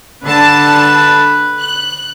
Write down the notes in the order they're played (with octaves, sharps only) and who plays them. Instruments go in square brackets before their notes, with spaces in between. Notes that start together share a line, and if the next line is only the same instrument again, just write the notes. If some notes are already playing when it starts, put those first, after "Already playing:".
[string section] D3 A5 [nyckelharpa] B4
[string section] F#6